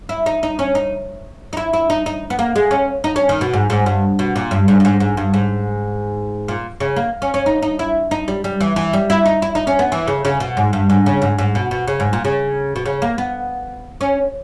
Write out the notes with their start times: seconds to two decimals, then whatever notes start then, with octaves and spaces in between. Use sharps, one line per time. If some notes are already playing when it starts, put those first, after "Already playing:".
0.09 E4
0.26 D#4
0.43 D#4
0.59 C#4
0.75 D#4
1.53 D#4
1.57 E4
1.73 E4
1.90 D#4
2.06 D#4
2.30 B3
2.39 A#3
2.56 G#3
2.71 C#4
3.04 D#4
3.16 C#4
3.29 D#3
3.41 B2
3.53 G#2
3.70 G#2
3.86 G2
4.19 B2
4.36 A#2
4.51 G2
4.68 G#2
4.80 G2
4.85 G#2
5.00 G#2
5.17 G2
5.34 G#2
6.48 A#2
6.80 C#3
6.96 A#3
7.22 C#4
7.34 C#4
7.46 D#4
7.62 D#4
7.79 E4
8.11 D#4
8.28 G3
8.44 G3
8.61 E3
8.76 E3
8.93 G3
9.10 E4
9.26 D#4
9.42 E4
9.55 D#4
9.67 C#4
9.79 B3
9.92 E3
10.08 C#3
10.25 C#3
10.40 B2
10.57 G#2
10.73 G2
10.90 G#2
11.06 C#3
11.22 G#2
11.38 G#2
11.55 B2
11.71 B2
11.88 C#3
12.00 G#2
12.13 A#2
12.25 C#3
12.76 B2
12.86 C#3
13.02 A#3
13.18 B3
14.01 C#4